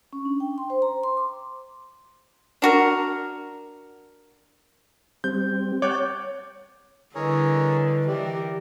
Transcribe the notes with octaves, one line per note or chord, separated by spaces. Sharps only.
C#4
D4
G5
C6
C5
A#5
C6
D6
D4 F#4 A#4
G3 C4 G6
C#5 F#5 G5 A5 D6
D3 G3 E4 G#4 A#4 B4 C#5 D#5
E3 G4 A#4 D5